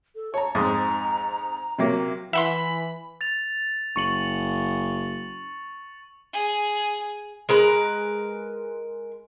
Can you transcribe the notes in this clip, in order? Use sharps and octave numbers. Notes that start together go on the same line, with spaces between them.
A4
C#5 A5 A#5
F2 G#2 D#5 A#5
C3 F#3 A#3
E3 E5 F#5 B5 C6
A6 F7
F#1 C#6 C#7 F#7
G#4
G#3 A#4 B4